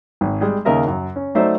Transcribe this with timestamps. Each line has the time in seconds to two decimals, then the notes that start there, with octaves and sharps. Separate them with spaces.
0.21 G#1
0.41 G3 G#3
0.65 D#2 C#3 A#4 D#5 E5
0.87 F#2
1.16 C#4
1.35 F#3 A3 D#4 C5 D5 E5